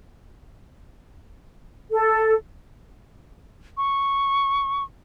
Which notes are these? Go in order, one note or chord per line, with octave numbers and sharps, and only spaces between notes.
A4
C#6